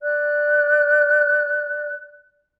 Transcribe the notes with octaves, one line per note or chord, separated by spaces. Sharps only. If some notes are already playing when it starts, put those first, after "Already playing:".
D5 F#6